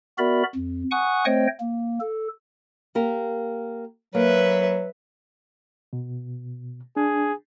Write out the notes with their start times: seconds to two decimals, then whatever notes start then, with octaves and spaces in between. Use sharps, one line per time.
0.18 B3 F#4 A#4 D5 E5 B5
0.55 F2
0.91 F#5 G#5 C#6 D#6 F#6
1.25 A3 C4 C5 C#5 D#5 G5
1.60 A#3
2.00 A4
2.95 A#3 G4 A#4
4.15 F#3 A#3 B4 E5
5.93 B2
6.96 D4 G#4